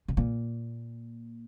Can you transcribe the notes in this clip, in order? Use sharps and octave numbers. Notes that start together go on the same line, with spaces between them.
B2
A#2